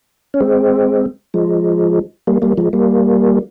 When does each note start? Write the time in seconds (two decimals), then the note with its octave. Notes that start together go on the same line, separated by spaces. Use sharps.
0.34 C#4
0.40 G#3 C4
1.34 F3 G#3
2.27 G3 A#3
2.42 G3 A#3
2.57 F3 G#3
2.73 G3 A#3